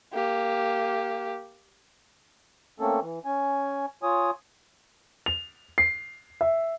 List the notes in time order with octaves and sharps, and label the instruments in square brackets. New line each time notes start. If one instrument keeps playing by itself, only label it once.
[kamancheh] A#3 G4
[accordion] A3 A#3 C4 C#4 A4
E3
C#4 G#5
F4 C#5 G#5 D#6
[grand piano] F7
C7
E5